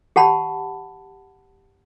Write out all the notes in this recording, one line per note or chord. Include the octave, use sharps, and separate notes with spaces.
G4 F#5 A5 B5